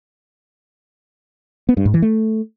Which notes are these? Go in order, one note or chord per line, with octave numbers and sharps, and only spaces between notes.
B3
G2
G#2
E3
A3